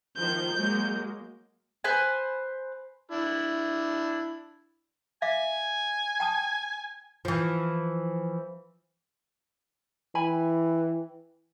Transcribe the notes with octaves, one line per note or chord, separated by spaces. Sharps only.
D#3 F3 C5 G6
F#3 G#3 A#3
B4 C5 G#5
D4 E4
E5 F5 G#5 D6
G5 A5 D#6
E3 F3
E3 G5 G#5 B5